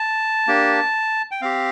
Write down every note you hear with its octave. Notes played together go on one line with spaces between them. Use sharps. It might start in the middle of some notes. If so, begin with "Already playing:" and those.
Already playing: A5
A#3 D4 G4
G5
C4 G4 F5